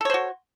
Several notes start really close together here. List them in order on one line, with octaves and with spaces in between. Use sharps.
A4 C#5 C5 F#4